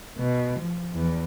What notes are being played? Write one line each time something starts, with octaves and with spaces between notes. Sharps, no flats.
B2
F3
E2